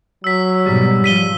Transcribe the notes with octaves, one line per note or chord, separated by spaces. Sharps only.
F#3 E6 B6
G#2 B2 G3
F3 B6 D#7 G7